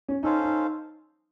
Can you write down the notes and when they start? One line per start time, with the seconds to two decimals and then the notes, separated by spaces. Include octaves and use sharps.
0.09 C#4
0.23 C#4 D#4 A4 C5 F5
0.44 D#4